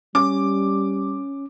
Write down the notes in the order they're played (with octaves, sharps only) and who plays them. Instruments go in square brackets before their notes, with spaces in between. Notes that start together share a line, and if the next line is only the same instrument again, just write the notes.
[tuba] G3 [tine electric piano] C#4 [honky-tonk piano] D6